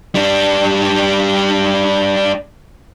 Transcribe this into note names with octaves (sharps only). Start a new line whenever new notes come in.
G3 D4